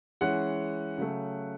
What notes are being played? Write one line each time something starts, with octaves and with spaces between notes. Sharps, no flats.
E3 G#3 C#4 F#5
C#3 F#3 A3